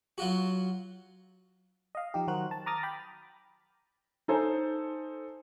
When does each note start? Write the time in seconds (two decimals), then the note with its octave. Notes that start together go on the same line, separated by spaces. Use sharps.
0.18 F#3 F4 F#4
1.95 D#5 F5
2.14 F3 D#4 G4
2.27 D#3 F#3 F#4 A#4 C5 F#6
2.51 A5
2.66 A#5 D6 D#6 F6 A6 A#6
2.83 G5 B5 D6
4.28 D#4 A4 C5 G#5